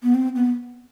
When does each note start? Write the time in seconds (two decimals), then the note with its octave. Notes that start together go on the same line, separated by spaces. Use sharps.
0.03 B3
0.15 C4
0.36 B3